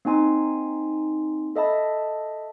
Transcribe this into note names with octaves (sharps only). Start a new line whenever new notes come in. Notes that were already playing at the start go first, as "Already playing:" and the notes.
A#3 C4 D#4 G#5 C6
A4 D#5 E5 A5 B5